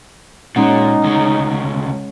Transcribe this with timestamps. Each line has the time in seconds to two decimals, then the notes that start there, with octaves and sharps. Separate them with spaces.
0.56 A#2 G#3 C#4 D#4 F#5
1.04 D2 C#3